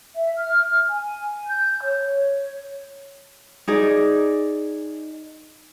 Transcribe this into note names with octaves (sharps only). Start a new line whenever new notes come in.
E5
F6
G#5
G6
C#5
D#4 G#4 D5